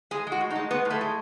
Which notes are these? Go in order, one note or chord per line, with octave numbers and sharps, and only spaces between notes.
G#3 G#4
G#3
F#4
A2
D#4
G#3
G#3 B3
A2
A3
G#3